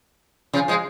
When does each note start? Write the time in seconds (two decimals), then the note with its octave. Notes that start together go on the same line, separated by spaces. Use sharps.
0.53 C#3 F3
0.68 F3 G#3